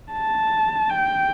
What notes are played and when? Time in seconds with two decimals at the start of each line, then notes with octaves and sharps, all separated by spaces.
0.13 A5
0.89 G5